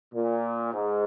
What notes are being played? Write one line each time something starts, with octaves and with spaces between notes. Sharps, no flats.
A#2
G#2